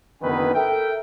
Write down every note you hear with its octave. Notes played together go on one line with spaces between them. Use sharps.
F#1 D3 D#3 B3 B4 G#5
A4 A#4 E5 G5